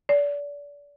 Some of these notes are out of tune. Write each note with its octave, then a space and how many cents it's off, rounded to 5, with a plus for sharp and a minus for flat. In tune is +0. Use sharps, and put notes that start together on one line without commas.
D5 -30